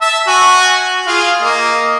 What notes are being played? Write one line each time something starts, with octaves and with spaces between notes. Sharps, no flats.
E5 A5 E6
F#4 G#5
F4 G#4 F5
A#3 D#5